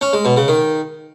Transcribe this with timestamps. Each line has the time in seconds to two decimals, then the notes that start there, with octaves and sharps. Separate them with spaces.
0.01 C#4
0.13 G#3
0.25 B2
0.37 C#3
0.48 D#3